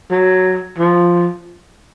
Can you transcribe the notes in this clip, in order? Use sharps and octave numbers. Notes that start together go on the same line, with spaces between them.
F#3
F3